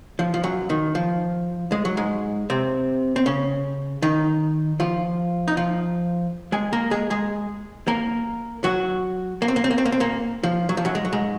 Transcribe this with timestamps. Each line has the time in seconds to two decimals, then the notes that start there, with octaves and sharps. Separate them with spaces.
0.19 F3
0.34 F3
0.43 F#2 F#3
0.70 D#3
0.95 F3
1.72 G#3
1.85 F#3
1.97 G#2 G#3
2.50 C3 C4
3.16 C4
3.26 C#3 C#4
4.02 D#3 D#4
4.80 F3 F4
5.48 D#4
5.57 F3 F4
6.52 G#3 G#4
6.73 A#3 A#4
6.91 G#3 G#4
7.10 G#3 G#4
7.87 A#3 A#4
8.64 F#3 F#4
9.42 A#3
9.48 C4
9.56 A#3
9.64 C4
9.71 A#3
9.78 C4
9.85 A#3
9.92 C4
10.00 A#2 A#3
10.43 F3
10.69 F#3
10.77 F3
10.85 F#2 F#3
10.95 G#3
11.05 F#3
11.13 G#2 G#3